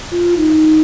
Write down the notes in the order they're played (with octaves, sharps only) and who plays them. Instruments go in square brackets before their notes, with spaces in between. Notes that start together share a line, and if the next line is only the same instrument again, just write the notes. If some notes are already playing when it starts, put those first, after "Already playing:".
[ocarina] F4
D#4